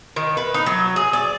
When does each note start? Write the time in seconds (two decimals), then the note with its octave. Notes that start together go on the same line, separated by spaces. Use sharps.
0.16 D#3
0.37 B4
0.54 D#4
0.66 F#3
0.96 G#4
1.13 D5